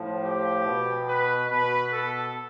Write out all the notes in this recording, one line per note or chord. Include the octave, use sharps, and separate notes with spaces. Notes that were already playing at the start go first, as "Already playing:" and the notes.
Already playing: A2 F3
G4
B2
B4
B2 B4
A4